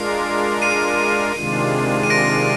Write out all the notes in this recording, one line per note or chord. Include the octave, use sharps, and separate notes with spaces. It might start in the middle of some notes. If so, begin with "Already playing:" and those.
Already playing: G#3 D4 F4 A#4 C7
C7 D#7
C3 D#3 G#3 D4 F4
D#7
A#6 D7